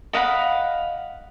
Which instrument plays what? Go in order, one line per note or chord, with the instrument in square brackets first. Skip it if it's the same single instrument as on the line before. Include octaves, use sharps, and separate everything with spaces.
[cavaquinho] D#5 F5 F#5 B5